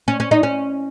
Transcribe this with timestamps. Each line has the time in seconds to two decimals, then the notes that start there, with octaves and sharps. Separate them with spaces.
0.08 C#4
0.20 C#4
0.31 D#4
0.43 C#4